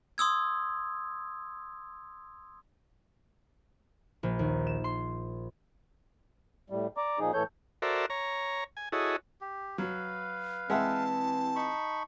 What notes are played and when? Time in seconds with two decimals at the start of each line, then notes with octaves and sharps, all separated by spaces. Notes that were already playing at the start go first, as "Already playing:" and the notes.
0.18 C6 D#6 E6 G#6
4.23 A#1
4.39 D#2
4.67 E7
4.84 C6
6.70 A2 G3
6.97 D5 A#5 D6
7.19 A#2 F3 D#4 G#4
7.34 A2 E3 A4 C#5 G6
7.82 F#4 A4 A#4 C5 D5 E5
8.10 C#5 A#5
8.77 G#5
8.92 E4 F#4 G#4 A4 C#5 D#5
9.41 G4
9.78 F#3 B4 F5
10.70 E3 G#3 C4 E5 F#5 A5
11.56 D#4 B5 C#6